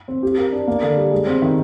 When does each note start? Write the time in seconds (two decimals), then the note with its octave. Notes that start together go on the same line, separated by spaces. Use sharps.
0.08 C4
0.23 G4
0.38 A#4
0.52 D4
0.68 A#3
0.82 D3
0.97 G3
1.11 G#3
1.27 C4
1.42 D#3